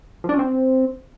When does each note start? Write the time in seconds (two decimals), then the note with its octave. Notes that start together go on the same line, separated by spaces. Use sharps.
0.24 F3
0.29 D4
0.34 C#4
0.39 C4